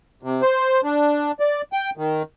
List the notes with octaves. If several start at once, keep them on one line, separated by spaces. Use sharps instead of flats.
C3
C5
D4
D5
G5
D#3